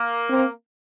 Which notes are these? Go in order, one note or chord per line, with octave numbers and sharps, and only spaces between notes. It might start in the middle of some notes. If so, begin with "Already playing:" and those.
Already playing: A#3
C4